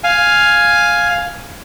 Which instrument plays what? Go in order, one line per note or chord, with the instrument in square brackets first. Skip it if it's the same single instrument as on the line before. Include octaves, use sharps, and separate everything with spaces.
[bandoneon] F5 G#5